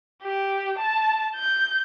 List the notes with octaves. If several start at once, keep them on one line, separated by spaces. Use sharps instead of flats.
G4
A5
G6